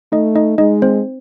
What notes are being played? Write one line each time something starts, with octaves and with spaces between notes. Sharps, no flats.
A3 D#4 D#5
D#4 D#5
G#3 D#4 D#5
C4 C5